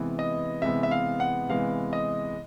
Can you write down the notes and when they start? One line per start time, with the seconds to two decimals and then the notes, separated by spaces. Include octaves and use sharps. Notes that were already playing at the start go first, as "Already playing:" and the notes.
Already playing: C3 E3 G#3 B3
0.19 D#5
0.62 C3 E3 G#3 B3 E5
0.83 E5
0.91 F5
1.20 F#5
1.49 C3 E3 G#3 B3 F5
1.93 D#5